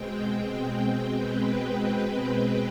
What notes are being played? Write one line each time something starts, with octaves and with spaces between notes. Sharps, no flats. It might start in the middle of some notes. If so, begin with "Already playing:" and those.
Already playing: B2 G#3 C4 G5
B4